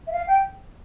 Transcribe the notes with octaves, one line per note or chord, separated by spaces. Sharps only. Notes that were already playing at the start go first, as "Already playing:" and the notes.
E5
F5
G5